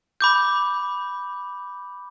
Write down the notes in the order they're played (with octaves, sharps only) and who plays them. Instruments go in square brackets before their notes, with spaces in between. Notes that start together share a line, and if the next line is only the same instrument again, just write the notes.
[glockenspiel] B5 D6 G6